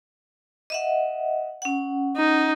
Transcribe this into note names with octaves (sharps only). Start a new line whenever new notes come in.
D#5 E5 F#5
C#4 F#5
D#4